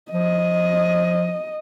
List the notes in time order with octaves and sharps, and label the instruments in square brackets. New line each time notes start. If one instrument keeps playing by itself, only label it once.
[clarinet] F3 [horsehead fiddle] D#5